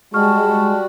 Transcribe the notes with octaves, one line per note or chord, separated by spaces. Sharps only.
G3 G#3 F#4 A5 C#6 F6